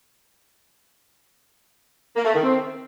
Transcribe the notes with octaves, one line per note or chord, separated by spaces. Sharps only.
A#3
A3
D#3
C4